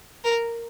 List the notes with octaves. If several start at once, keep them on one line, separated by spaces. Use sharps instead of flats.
A#4